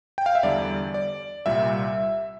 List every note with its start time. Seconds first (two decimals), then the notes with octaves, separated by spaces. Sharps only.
0.18 G5
0.26 F5
0.35 E5
0.43 E2 D3 G3 D5
0.94 D5
1.46 C2 A#2 G3 E5